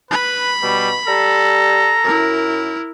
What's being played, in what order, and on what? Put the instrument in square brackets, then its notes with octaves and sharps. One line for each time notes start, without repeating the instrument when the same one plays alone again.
[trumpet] B4 [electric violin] B5
[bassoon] B2 [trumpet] G3
[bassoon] G3 [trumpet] A4 [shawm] A#5
[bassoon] F#2 [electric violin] E4 A#4